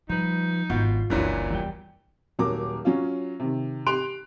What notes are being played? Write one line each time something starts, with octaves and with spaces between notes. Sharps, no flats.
F3 G3 D#4 B4
G#1 B2 E4 F4
F#1 C#2 G2 A#2 E3 F#3
E2 G3 G5
D#1 F#3 A#4 D6
F#3 C#4 F4
C3 D#3
G4 C6 F#6 D7 F7